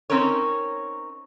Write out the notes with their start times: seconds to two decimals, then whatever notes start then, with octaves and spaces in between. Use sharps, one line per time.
0.10 C4 C#4 D#4 A#4 C#5